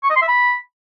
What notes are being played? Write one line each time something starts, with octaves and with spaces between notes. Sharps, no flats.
C#6
D#5
C6
E5
B5